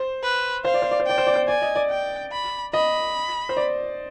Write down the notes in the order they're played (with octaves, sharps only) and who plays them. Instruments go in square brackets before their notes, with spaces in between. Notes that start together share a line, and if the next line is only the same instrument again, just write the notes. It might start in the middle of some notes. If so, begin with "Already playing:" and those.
Already playing: [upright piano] C5
[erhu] B4
[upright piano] C5 [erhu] F5
[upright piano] D5
C5
D5
C5
[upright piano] D5 [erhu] G5
[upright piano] C5
D5
C5
[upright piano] D5 [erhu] G#5
[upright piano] D#5
D5
[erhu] G5
B5
[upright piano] D#5 [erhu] B5
[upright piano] C5
D5